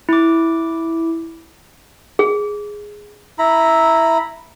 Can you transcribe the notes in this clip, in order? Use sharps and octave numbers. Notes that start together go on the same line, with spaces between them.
E4 D6
G#4
E4 A#5 B5